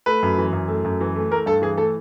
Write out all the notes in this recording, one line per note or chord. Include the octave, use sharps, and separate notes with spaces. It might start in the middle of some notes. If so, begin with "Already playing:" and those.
A3 B4
F#2
E3
F#2
A3
F#2
E3
A3
A3 A#4
G2 A4
E3 G#4
A3 A4